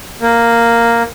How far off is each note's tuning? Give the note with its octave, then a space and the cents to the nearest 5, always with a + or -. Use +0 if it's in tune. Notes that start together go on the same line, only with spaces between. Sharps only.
A#3 -5